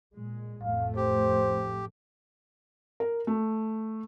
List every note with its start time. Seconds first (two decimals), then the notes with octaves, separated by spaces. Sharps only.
0.14 A#2 G#3
0.63 A1 F2 A3 F5
0.96 G4 C5
3.00 A#4
3.27 A3